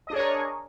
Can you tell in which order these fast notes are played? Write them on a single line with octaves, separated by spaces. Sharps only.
D#5 D4 G#4 C#5 A#4